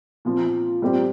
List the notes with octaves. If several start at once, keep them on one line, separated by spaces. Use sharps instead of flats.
A#2 F3 C4
A#2 G3 C4 G4